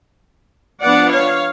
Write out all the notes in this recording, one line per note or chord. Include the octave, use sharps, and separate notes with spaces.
F3 B3 D4 D5 F#5
C#5 F5